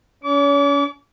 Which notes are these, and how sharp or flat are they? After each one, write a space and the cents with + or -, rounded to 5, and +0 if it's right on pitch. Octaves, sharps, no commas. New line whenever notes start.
C#4 +35 C#5 +40 D6 -35